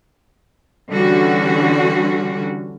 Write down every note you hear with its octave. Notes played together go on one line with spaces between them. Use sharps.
D3 E3 G3 C#4 F#4